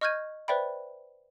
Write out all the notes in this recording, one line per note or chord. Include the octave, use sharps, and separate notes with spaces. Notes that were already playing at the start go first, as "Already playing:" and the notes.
D#5 C#6 F6 G6 G#6 D#7
B4 C5 D5 E5 G5 B5